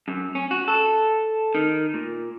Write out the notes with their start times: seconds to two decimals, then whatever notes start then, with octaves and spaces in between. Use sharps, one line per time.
0.08 F#2
0.35 C#4
0.51 F#4
0.68 A4
1.55 D#3
1.94 A#2